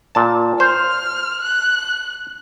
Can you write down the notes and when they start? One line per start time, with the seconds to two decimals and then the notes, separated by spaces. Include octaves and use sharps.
0.15 A#2 A5
0.60 C5 F6
1.42 F#6